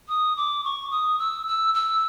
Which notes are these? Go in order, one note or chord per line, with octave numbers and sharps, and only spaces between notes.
D#6
D6
C#6
D#6
E6
E6
E6